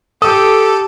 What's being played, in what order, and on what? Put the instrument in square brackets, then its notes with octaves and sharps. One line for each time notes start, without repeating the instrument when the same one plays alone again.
[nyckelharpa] G4 [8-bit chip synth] A4 [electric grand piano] D#6